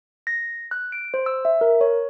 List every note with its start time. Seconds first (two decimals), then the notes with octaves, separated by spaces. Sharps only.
0.27 A#6
0.71 F#6
0.92 D7
1.14 C5
1.26 E6
1.45 E5
1.61 A#4
1.81 C#5